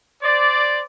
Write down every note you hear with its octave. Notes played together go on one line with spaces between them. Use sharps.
C5 D5